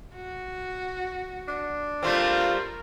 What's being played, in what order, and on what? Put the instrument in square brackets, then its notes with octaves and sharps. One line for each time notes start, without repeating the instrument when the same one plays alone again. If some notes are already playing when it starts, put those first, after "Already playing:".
[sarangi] F#4
[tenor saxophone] D4
[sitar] G3 A3 C4 [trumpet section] F4 [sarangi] A#4